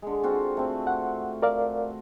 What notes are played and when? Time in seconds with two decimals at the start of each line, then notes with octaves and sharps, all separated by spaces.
0.02 D3 G#3
0.23 C4 F4 F#4
0.57 A3 C4
0.87 F#5
1.42 A#4 D5 F5